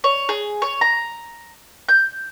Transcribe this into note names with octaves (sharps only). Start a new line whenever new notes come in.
C#5
G#4
C#5
A#5
G6